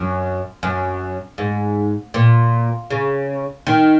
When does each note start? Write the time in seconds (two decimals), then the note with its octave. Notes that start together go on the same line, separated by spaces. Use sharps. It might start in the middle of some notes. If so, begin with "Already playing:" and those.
Already playing: F#2
0.63 F#2
1.38 G#2
2.14 A#2
2.90 C#3
3.67 D#3